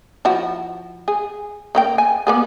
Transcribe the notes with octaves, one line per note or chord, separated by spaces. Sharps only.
F3 E4 F#4
G#4
C#3 A#3 G5
G#5
A#3 B3 G#4